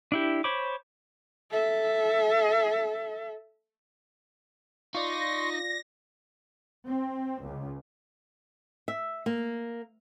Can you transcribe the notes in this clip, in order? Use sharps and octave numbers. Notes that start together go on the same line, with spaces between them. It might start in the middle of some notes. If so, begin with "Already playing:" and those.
D4 E4 G4
C5 C#5 B5 D6
A4 E5
D#4 F4 D5 C6 C#6 A#6
C4
C#2
E5
A#3